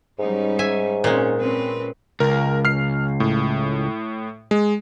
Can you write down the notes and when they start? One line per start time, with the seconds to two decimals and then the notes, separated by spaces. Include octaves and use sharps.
0.19 G#2 G3 C#4 D#4
0.59 E5 G#5
1.04 A#2 G#3 C4 C#4
1.36 C4 C#4 B4
2.20 C#2 A#4
2.65 F6 C7
3.20 A2
4.51 G#3